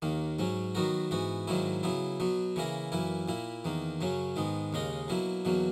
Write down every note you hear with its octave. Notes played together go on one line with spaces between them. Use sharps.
D#2 D#3 A#3
G#2 F#3 C#4
D#3 F#3 B3 F#4 A#4
G#2 E3 B3 F#4
G#2 D#3 F#3 A#3 E4
C#3 F#3 B3 E4
B2 F#3 B3
C#3 E3 A#3 E4 A#4
F#2 E3 A#3 E4
A#2 A#3 E4
E2 D#3 A#3
F#2 C#3 F#3 C#4
G#2 D#3 G#3 B3
D#2 C#3 G#3 D#4 A#4
B2 F#3 A#3 E4
E2 B2 F#3 A#3